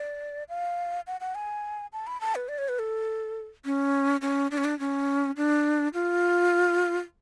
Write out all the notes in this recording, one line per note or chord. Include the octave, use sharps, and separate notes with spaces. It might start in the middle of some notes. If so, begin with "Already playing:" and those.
Already playing: D5
F5
F#5
F#5
G#5
A5
B5
A5
B4
D5
C#5
B4
A4
C#4
C#4
D4
C#4
D4
C#4
D4
F4